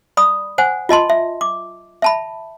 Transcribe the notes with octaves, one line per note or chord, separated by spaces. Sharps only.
D5 B5 D#6
C5 F#5 G#5
F4 D#5 A5 C6
E5
D6
E5 A5 B5